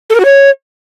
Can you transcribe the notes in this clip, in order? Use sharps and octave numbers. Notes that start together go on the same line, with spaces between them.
A4
A#4
F#4
C#5